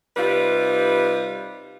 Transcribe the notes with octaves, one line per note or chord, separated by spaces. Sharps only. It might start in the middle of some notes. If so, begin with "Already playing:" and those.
C3 G3 D#4 F4 B4